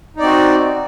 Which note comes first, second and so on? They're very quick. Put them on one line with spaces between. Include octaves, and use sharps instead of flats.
D#4 D5 C4 F#4